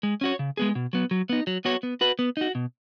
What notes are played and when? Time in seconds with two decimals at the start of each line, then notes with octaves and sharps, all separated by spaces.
0.03 G#3
0.21 C#4 F#4 C#5
0.39 C#3
0.57 G#3 B3 G#4
0.75 B2
0.93 F#3 B3
1.11 F#3
1.29 B3 D#4
1.47 F#3
1.65 B3 F#4 C#5
1.83 B3
2.01 F#4 B4
2.19 B3
2.37 D#4 F#4
2.55 B2